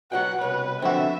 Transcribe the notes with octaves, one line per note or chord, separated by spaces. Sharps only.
B2 F#4 C#5 F#5 G5
C2 B4 C#5
D3 F3 C4 F#4 E5 B5